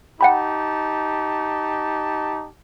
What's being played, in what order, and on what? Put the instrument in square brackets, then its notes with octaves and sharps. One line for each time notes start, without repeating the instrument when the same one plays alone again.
[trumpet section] D#4 G4 A5 [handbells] F#5 G5 B5